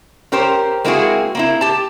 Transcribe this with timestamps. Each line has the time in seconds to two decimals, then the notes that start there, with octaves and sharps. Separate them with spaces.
0.32 C#4 G4 A#4 C5
0.85 G#3 A#3 C4 E4 F#4 G#4
1.35 A#3 C4 E4
1.61 G4 A5